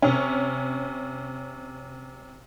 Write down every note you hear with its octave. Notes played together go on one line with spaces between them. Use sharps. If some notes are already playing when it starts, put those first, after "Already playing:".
C3 C#4